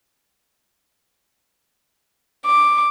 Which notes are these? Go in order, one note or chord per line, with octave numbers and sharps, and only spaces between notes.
D6